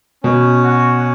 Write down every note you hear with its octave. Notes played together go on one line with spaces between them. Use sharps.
B2 C#4
F#4